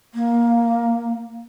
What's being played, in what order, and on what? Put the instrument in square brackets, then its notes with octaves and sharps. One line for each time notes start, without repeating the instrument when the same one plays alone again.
[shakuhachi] A#3